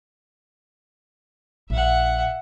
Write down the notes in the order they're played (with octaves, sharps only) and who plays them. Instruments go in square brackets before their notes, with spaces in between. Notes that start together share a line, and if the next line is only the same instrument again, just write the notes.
[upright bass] A#1 [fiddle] E5 F#5